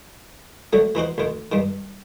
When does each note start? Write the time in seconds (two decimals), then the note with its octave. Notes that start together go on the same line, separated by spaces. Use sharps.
0.73 D3 F#3 A3
0.95 E3 D#4 F#4 C5
1.18 D2 D#3
1.52 G2 D#3